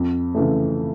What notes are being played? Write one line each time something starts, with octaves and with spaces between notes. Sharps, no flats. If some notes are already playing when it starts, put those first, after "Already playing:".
Already playing: F2
C#3 E3 A3